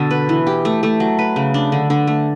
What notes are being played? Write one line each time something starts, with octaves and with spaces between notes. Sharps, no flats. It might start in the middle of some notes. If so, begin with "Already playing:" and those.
Already playing: B2 D3 A4
B4
E3
G4
A3
A3
F#3
B4
C#3
D4
D3
D3
A3